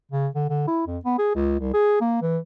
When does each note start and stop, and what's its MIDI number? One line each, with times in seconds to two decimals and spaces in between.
0.11 0.28 49
0.35 0.46 50
0.50 0.67 50
0.67 0.83 64
0.87 0.98 41
1.05 1.15 59
1.19 1.30 68
1.35 1.55 37
1.60 1.71 36
1.74 1.99 68
2.01 2.20 58
2.22 2.38 52